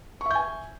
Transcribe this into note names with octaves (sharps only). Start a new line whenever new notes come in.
E5 G#5 C#6 G6